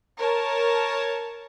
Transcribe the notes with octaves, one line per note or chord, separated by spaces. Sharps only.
A#4 C#5 A5